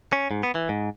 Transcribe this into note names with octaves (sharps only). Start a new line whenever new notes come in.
C#4
G#2
B3
E3
G#2